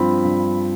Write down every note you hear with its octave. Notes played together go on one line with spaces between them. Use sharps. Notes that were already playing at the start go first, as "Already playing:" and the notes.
Already playing: G2 F3 C4 B5
G2